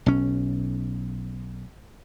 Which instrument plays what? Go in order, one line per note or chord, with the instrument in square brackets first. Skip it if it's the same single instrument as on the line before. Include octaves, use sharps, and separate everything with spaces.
[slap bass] B1 C#4